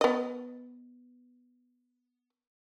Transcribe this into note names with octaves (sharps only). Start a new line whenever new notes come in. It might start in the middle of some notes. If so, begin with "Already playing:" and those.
B3 D#5